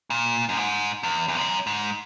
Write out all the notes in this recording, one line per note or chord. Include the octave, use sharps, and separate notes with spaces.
A#2
F#2
G#2
E2
E2
F#2
G#2